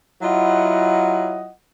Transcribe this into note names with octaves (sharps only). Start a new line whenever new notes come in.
F#3 E4 F4 D#5 F#5